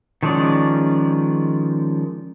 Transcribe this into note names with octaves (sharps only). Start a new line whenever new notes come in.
D#3 F3 G#3 C#4 D5